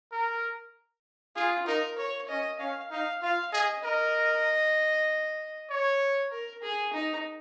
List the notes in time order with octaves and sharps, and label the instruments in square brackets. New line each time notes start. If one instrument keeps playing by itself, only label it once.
[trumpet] A#4
[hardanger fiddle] F4 [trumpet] G#4
[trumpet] D#4 [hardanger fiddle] A#4
[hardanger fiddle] C#5
[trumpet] C#4 [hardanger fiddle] D#5
[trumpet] C#4 [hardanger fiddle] F5
[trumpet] D#4 [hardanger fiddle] F5
[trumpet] F4 [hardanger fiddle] F5
[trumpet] G#4 [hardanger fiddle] D#5
[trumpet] A#4 [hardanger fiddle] D#5
[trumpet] C#5
[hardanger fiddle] A#4
G#4
D#4